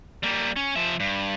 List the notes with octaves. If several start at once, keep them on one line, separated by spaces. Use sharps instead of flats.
G3 A#3
C#4
F3 E5
G2